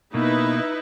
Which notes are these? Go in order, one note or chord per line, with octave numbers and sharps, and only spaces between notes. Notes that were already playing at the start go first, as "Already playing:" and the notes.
B2 A#3 D#4 E4 B4